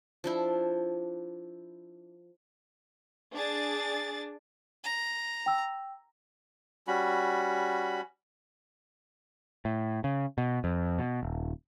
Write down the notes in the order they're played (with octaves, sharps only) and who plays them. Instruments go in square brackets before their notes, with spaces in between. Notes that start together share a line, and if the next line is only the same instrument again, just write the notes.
[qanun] F3 D4 E4
[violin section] D4 G#4 A6
[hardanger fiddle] A#5
[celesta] G5 E6
[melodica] G3 C#4 F#4 B5
[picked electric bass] A2
C#3
B2
F2
B2
D#1